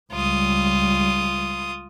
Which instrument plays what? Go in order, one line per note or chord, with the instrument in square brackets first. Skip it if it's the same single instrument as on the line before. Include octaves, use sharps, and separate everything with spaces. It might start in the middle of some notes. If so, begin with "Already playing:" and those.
[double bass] C#2 G3 [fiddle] F4 D#6